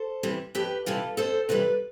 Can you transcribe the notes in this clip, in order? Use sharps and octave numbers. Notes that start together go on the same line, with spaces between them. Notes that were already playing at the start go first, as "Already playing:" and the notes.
Already playing: A4 C5
C3 E3 G3
F2 G4 B4
C3 E3 G3 F4 A4
F2 A4 C5
C3 E3 G3 B4 D5